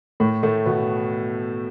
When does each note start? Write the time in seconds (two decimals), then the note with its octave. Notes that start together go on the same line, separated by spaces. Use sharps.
0.20 A2 A3
0.43 A2 A3
0.66 B2 B3